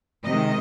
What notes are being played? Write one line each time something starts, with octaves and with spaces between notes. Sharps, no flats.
C3 D#3 G#3 D#5